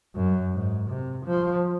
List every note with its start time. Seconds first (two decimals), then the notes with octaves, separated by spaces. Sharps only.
0.16 F#2
0.54 G#2
0.90 C3
1.26 F3